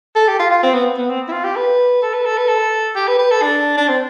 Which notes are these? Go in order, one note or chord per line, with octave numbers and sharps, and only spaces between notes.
A4
G4
F4
F4
C4
B3
B3
C4
E4
F4
G4
B4
A4
B4
A4
B4
A4
G4
B4
B4
A4
D4
D4
C4